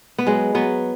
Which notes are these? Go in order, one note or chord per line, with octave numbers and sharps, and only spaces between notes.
B3
F#3 G#3
F#3 B3